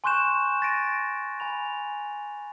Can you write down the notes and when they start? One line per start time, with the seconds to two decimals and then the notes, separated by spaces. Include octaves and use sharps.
0.04 G#5 C6 C#6 F#6 G6 E7
0.62 A6 A#6 D7 D#7
1.40 G#5 B5 F7